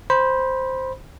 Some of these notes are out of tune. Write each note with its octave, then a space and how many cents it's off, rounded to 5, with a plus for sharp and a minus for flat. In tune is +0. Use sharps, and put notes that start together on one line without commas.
C5 +0 B5 -20